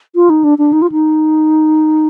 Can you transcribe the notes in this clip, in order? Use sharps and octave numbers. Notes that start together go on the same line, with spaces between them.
F4
D#4
D4
D4
D#4
F4
D#4